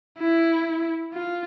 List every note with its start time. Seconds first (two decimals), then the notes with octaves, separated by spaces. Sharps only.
0.18 E4
1.13 F4